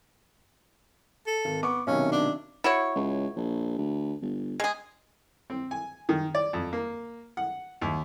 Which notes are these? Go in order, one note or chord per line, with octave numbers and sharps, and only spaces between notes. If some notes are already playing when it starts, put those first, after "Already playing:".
A4
G#1
B3 C#6 D6
B1 C3 D#3 C#4
D4
E4 F#4 C#5
C#2
A#1
D2
G1
G#3 G#4
C4
G#5
D#3
D5
F2
A#3
F#5
D#2